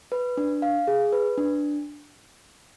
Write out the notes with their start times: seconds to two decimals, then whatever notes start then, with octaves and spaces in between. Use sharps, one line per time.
0.12 B4
0.37 D4
0.62 F5
0.87 G#4
1.13 B4
1.38 D4